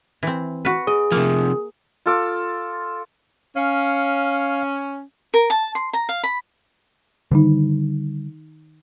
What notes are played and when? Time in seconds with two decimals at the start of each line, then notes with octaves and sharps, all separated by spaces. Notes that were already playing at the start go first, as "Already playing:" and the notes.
0.23 E3 C4
0.65 F#4 B4
0.87 G#4 D#5
1.12 C3 F3 A#3
2.06 F4 A4 D6
3.56 C#4 F5
5.34 A#4
5.50 A5
5.75 C6
5.93 A#5
6.09 F5
6.23 B5
7.31 D3 D#3 G3 D#4